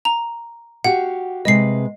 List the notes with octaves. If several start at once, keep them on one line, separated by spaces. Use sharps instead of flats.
A#5
F#4 G4 F5 F#5
C3 G#3 B4 D#5 C7